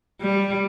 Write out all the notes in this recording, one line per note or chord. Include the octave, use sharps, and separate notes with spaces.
G3